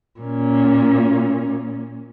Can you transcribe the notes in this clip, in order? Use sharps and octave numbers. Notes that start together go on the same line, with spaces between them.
A#2 C#4